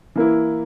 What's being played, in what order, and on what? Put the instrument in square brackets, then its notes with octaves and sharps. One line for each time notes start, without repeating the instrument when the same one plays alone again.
[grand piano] E3 A#3 E4